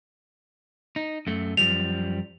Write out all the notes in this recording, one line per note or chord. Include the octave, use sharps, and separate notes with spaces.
D#4
F#2 A3
F#2 F3 G3 F7